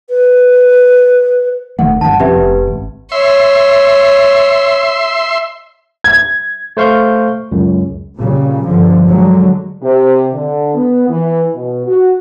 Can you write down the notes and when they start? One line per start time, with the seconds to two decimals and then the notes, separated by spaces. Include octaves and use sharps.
0.10 B4
1.79 D#1 D#3 A3 F#5
2.01 G#1 G2 D#3 F#5 A5
2.20 F2 C3 C#4 G4 B4 E5
2.34 F1
2.67 G#1
3.12 C#5 E5 C6
6.04 G#6
6.77 A3 C5 F5 C#6 G6
7.52 C#2 F#2
8.16 A#2 C#3 G3
8.65 G2 D3 F3
9.05 D3 F#3 G#3
9.81 C3
10.32 D3
10.74 B3
11.08 E3
11.55 B2
11.85 F#4